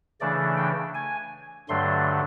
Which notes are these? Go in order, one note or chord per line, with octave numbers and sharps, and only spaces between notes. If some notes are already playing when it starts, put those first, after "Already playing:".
C#3 E3 A3 D4 D5
G5
G#5
G2 D3 F#3 A3 D4 C6